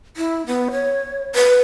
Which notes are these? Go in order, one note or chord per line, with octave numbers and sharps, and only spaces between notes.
E4
B3
C#5
B4